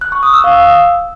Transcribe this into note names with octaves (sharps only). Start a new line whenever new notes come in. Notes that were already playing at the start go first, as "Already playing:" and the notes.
F#6
C#6
D#6
E6
F5